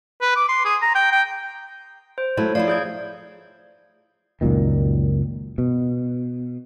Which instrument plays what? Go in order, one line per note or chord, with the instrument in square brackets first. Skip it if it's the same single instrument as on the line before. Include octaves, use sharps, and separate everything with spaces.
[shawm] B4
D6
C6
G#4
A#5
G5
G5
[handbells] C5
[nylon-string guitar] F#3 A3 E4 [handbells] C#5
[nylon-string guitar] F3 D#4 E4 [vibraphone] D5 [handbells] F5
[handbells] G#4 G6 G#6
[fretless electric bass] C#2 F#2 A#2 D#3
B2